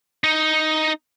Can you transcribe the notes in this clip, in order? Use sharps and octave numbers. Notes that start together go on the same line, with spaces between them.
D#4